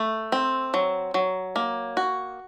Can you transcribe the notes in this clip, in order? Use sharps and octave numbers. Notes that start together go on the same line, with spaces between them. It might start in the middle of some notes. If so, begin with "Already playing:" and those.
Already playing: A3
C4
F#3
F#3
A#3
F#4